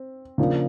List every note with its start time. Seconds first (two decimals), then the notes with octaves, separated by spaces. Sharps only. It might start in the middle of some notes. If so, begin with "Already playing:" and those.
Already playing: C4
0.38 C#3 F3 A#3 D4